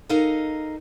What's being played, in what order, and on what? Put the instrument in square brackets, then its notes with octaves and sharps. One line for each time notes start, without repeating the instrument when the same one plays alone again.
[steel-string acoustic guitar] D#4 A4 A#4 D#5 F5